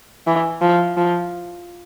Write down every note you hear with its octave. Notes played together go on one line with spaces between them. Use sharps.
E3
F3
F3